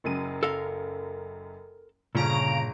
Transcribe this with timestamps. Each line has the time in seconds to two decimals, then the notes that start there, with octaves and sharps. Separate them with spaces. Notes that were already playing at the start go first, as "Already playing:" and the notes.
0.04 F#1 F#2 D#7
0.43 A4 A#4 F5
2.15 G1 A#2 C#3 F3 A#5 D7